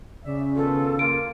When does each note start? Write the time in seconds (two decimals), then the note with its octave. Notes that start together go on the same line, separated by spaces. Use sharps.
0.25 C#3 C#4 D5 E5
0.56 D#3 B3 F4 A4
0.99 A#3 F4 D7